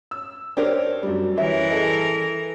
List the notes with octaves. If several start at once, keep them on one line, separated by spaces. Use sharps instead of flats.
E6
D4 G4 A#4 C5 C#5
F#2 G3
E3 C#4 A#4 E5
G#4 A4 D#5